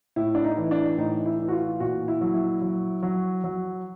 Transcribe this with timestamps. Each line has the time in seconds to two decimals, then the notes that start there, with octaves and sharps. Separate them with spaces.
0.16 A2 E4
0.35 D4
0.44 D#4
0.57 E3
0.71 D4
0.98 A2 D#4
1.26 E4
1.39 E3
1.48 F#4
1.52 F4
1.80 A#2 F#4
2.08 E4
2.21 F#3
2.34 E4
2.62 F#3
3.03 F#3
3.44 F#3